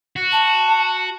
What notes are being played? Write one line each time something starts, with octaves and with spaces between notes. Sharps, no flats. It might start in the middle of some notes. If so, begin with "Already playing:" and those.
F#4
A5